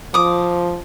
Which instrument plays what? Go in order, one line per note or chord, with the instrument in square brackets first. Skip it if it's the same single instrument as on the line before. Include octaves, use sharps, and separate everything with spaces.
[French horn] F3 [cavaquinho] D6 D#6